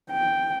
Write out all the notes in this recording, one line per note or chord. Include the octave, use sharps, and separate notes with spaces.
G5